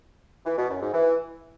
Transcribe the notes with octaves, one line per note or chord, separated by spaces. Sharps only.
E3
B2
F#2
G#2
E3